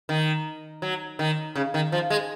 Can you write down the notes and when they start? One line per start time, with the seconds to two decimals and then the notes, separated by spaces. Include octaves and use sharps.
0.09 D#3
0.82 F#3
1.19 D#3
1.55 C#3
1.74 D#3
1.92 F3
2.10 G#3